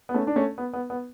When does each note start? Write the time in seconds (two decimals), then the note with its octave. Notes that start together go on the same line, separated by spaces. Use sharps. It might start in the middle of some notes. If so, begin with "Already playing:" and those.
0.09 B3
0.14 A3 C#4
0.27 D4
0.36 A3 C#4
0.58 B3
0.73 B3
0.90 B3